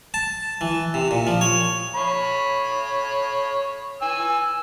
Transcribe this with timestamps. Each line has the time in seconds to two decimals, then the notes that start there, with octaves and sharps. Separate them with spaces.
0.14 A5
0.61 E3
0.94 C3
1.11 A#2
1.27 F3
1.41 C#5
1.95 C#5 B5
4.02 G#5 E6